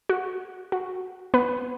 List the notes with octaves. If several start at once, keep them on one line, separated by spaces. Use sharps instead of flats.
F#4
F#4
B3 B4